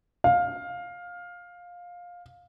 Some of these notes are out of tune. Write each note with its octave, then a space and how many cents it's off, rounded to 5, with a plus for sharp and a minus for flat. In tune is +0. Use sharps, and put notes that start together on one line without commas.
F5 +15